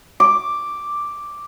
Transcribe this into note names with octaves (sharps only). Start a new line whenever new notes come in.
D6